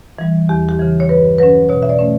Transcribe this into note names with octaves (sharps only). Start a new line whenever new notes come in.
E3 G3
E2 G4
G4
C#3 E3
C#5
G2 B4
F#3 C#4 B4
B2 C#5
E5
D5
A3 C#4